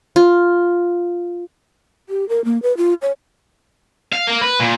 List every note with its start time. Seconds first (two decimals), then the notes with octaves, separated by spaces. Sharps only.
0.16 F4
2.09 G4
2.29 A#4
2.45 A#3
2.62 B4
2.77 F4
3.02 C#5
4.13 F5
4.27 A#3
4.42 B4
4.60 A#2